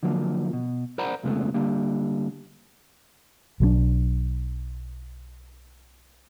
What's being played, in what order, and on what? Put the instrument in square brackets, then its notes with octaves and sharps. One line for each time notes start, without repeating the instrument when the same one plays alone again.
[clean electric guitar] D3 F3 F#3 A#3
B2
A#4 C5 D5 F#5 A#5 B5
C2 F2 C#3 G#3 A3 B3
D3 G3 A#3
[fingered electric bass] B1 F#3 G3 D4